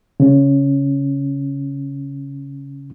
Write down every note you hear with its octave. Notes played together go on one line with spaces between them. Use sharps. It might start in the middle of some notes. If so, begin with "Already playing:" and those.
C#3 C#4